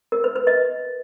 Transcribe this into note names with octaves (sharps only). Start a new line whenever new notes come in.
A#4
B4
B4
D#5